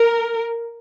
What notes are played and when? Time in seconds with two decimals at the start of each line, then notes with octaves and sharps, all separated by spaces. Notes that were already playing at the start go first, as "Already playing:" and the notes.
Already playing: A#4